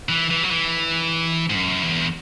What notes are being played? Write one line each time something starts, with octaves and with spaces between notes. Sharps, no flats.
E3
E3
F#3
E3
G#2
F#2
E2